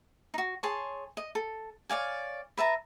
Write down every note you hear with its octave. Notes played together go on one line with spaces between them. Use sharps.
D#4 F#4
G#4 C#5 A5 C6
D#5
A4
C#5 D5 F5 G#5
B4 E5 A5 A#5